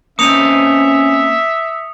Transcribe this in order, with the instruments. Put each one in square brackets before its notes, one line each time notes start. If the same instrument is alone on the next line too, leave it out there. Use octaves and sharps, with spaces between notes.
[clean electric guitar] A#3 C4 D#5 [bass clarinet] C#4 [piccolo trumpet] E5 [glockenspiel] D#6 C#7 F7